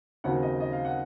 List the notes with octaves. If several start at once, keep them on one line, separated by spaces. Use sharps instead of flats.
D#2 C#3 F#3 C4 D#4 F#5
D#5
D#5
F5
F#5